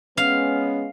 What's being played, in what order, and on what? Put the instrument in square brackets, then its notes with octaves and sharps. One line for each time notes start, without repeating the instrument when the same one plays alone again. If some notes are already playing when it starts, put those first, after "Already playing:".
[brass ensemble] G#3 B3 C#4 [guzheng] F5